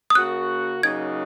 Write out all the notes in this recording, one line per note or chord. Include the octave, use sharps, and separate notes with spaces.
D#6
C#3 A#3 F#4 F#6
C#3 F#3 A#3 D#4 F#4 G#6